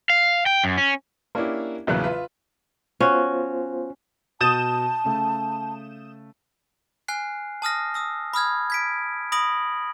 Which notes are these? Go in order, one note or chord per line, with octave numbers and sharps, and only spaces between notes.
F5
G5
F#2
C#4
A#3 C#4 D4 E4 G4
A#1 E2 C#3 F#3 B4 F#6
F4 B4 E5
B3 C#4 F4 F#4 C5
B2 F#4 A5 D#6 G6 A6 E7
C#3 A3
G#5 F6 F#6 C7
A5 D#6 F6 A#6
D#6 E6 A#6
B5 D#6 F6 G#6
G#6 B6 D7
B5 D#6 A#6 D7 F#7